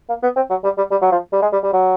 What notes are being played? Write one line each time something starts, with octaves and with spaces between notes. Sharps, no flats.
A#3
B3
C4
F#3
G3
G3
G3
F#3
F3
G3
G#3
G3
G3
F#3